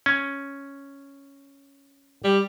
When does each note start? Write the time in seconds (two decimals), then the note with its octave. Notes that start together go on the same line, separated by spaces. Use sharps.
0.06 C#4
2.24 G3